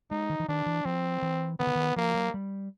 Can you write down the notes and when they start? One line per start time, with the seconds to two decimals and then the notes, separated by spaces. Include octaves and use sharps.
0.11 G#3 D#4
0.30 D#3
0.40 E3
0.48 D#3 D4
0.66 E3
0.85 F3 C4
1.22 E3
1.59 D#3 B3
1.67 D3
1.75 D#3
1.96 F3 A#3
2.14 F#3
2.34 G3